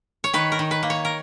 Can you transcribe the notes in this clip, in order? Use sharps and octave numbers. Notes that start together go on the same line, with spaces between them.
C#5
D#3 B4
A#4
D#3
B4
A#3
C#5
A#4